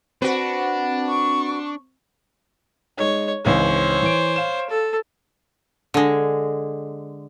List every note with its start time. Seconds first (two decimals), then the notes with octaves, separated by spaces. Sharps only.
0.22 C4 D4 F#4 B4
1.09 C#6
2.97 G#3 D#4 C#5
3.45 G#1 C#2 E3 C5 C#5
4.02 E3 D7
4.36 F5 E7
4.70 A4
5.94 D3 G#3